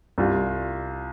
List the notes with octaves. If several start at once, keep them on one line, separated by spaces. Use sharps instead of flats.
C2 F4